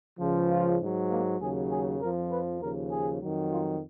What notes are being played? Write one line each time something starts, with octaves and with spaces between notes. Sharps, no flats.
C#2 C#3 F3
F4
G#2 F#3
A#3
D#2 C#3 F#3 G#4
G#4
F2 F3 A#4
B4
D#2 C#3 F3 A#4
G#4
F2 D#3 F#3
F4